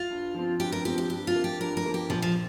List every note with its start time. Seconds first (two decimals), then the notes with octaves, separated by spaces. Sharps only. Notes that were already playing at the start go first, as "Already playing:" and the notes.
Already playing: F4
0.10 G2
0.34 F3 C4
0.60 G2 G4
0.72 A#4
0.85 F3 C4 G4
0.98 G4
1.10 G2 G4
1.27 F4
1.35 F3 A#3
1.44 G4
1.60 G2 A#4
1.77 A#4
1.86 F3 A#3
1.94 G4
2.10 A#1 F3
2.22 F3